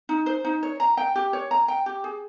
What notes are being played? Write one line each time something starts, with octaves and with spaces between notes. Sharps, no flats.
D#4
C5
D#4
C#5
A#5
G5
G4
C#5
A#5
G5
G4
G#4